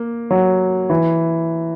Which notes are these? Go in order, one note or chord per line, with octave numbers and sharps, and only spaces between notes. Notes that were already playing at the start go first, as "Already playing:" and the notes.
Already playing: A#3
F#3
E3